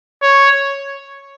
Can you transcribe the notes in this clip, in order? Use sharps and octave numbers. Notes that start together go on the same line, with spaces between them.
C#5